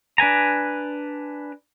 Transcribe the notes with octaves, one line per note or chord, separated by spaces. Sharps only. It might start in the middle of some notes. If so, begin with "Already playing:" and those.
D4 B4 G#5 A#5